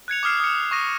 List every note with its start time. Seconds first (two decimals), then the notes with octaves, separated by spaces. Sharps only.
0.08 F#6 G#6 C#7 F7
0.23 D6 D#6 F6 C7
0.40 D#6 C#7
0.71 C#6 D#6 A#6 D#7